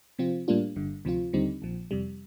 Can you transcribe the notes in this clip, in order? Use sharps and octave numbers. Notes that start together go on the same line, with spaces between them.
C3 F3 C4 F4
A2 G3 A#3 D4 F4
G1 G2 D3
D2 C3 F3 C4 F4
D#2 D3 G3 C4 D#4
A#1 A#2 F3
F2 C3 G3